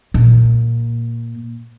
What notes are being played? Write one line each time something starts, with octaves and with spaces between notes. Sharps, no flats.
A#2